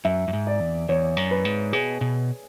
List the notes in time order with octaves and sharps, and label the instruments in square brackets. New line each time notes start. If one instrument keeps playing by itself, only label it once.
[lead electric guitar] F#2 [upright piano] E5
[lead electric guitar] F#2
G#2
[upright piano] D5
[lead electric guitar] E2
[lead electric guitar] E2 [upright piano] C#5
[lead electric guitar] F#2
[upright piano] B4
[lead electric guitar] G#2
[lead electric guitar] B2 [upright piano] G#4
[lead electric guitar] B2